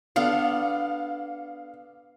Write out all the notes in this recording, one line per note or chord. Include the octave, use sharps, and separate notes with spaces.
B3 D4 A4 F5